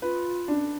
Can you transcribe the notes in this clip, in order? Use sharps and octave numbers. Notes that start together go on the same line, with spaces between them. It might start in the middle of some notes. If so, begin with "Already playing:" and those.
F4 B4
D4